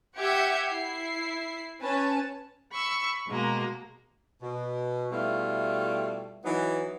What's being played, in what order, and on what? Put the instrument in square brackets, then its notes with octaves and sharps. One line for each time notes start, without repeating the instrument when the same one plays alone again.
[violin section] G4 E5 F#5 G6 G#6 C#7
E4 C7
C#4 B4 A5
[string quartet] B5 C#6 E6
B2 G#3 A#3 A#5
[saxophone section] B2
B2 G3 A3 E4 F4
E3 F#3 B3 D#4